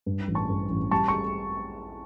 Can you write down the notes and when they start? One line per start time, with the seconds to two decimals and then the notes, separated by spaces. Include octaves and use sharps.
0.06 G2
0.28 A1
0.35 A5 C#6
0.49 G2
0.70 A1
0.91 G3 A5 C#6
1.08 C#6